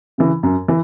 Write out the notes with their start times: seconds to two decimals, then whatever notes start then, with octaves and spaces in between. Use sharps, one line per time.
0.18 C#3 E3
0.43 F#2
0.68 E3